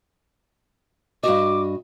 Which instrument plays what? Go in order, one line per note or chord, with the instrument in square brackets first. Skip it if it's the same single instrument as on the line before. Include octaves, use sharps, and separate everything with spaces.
[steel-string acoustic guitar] G2 D#5 [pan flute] F#4 [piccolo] D6